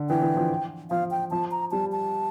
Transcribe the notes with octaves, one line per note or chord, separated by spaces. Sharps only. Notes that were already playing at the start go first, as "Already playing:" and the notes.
Already playing: D3
E3 G5
E3
F3
F3 F5
G5
F3 A5
A#5
G3 A5
A5